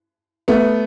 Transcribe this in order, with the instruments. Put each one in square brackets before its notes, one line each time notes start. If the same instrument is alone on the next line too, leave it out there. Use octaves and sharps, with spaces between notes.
[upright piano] A3 B3